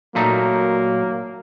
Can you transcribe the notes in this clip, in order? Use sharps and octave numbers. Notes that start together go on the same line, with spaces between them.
A#2 F#3 A3 A#3 D#4